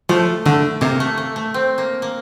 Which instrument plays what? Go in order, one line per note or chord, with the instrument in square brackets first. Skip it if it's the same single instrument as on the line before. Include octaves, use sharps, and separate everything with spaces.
[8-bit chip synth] F3 [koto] A3
[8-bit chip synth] D3 [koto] A3
[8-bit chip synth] C3 [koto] A#3
[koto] A3
A3
A3
C4
A#3
A#3